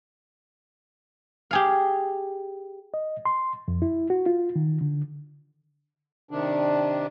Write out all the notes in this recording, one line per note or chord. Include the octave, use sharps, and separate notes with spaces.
G4 G#4 F5
D#5
C6
F2
E4
F#4
F4
D#3
D3
C3 D#3 D4